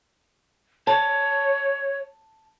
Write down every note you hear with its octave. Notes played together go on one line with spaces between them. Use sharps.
C#5 A5